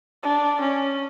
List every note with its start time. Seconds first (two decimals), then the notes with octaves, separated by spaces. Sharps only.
0.23 D4
0.61 C#4